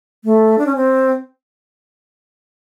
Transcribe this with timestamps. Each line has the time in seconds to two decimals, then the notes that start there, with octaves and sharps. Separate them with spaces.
0.25 A3
0.58 D4
0.66 C#4
0.76 C4